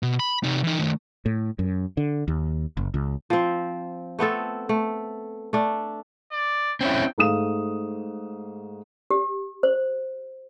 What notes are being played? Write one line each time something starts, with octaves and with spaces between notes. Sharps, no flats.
B2
B5
C3 D#4
E3 D#4
D#3 A3
A2
F#2
D3
D#2
F#1
C#2
F3 C4
A3 B3 C4 A4
A3
A3 D4
D5
C4 C#4 E4 G5
G#2 A3 F5 D#6 E7
G4
C5